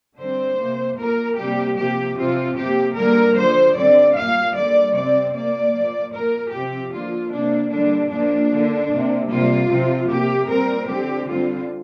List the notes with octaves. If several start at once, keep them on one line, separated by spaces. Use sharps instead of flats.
D3 G3 C4 C5
C3 A#3
A#2 A#3 A#4
C3 G3 A#3 G4
C3 F3 A#3 G4
C3 F3 C4 F4
C3 A#3 G4
D3 G3 A#3 A#4
D3 F3 A#3 C5
D3 G3 C4 D5
A#2 G3 A#3 F5
D3 G3 A#3 D5
C3 G3 C4 D5
A#2 A#3 D5
A#2 F3 A#3
A#2 A#3 A#4
C3 F3 C4 G4
D3 F3 A#3 F4
C3 A#3 D4
D3 G3 A#3 D4
A#2 F3 A#3 D4
D3 A#3
C3 A#3
C3 G3 A#3 F4
C3 F3 C4
C3 A#3 G4
A#2 G3 C4 A#4
D3 F3 C4 G4
D3 G3 C4 F4